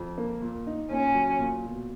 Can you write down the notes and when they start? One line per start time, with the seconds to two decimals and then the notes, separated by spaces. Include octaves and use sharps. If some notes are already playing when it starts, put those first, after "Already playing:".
Already playing: F2
0.18 A#3
0.42 A#2
0.67 D#4
0.91 A#2 C#4
1.15 F#3
1.39 A#2
1.64 B2